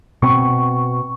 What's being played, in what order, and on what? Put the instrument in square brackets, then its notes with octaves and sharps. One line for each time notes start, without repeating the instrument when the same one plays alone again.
[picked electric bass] B2 C4 [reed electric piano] C#6